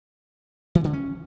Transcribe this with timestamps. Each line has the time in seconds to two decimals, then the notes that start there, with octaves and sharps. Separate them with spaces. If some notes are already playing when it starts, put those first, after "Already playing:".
0.75 E3
0.84 D3
0.93 C#4